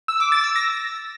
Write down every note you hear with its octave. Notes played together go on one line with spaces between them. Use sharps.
E6
D6
A6
E6
A#6